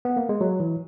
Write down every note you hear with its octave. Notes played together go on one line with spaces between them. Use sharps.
B3
A#3
G#3
F#3
E3